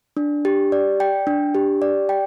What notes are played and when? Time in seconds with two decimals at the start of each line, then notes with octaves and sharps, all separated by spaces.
0.17 D4
0.45 G4
0.72 D5
1.00 G5
1.27 D4
1.55 G4
1.82 D5
2.09 G5